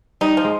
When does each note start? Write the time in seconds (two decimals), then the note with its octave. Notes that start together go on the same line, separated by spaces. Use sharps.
0.21 G3 D#4
0.37 F3
0.44 G#3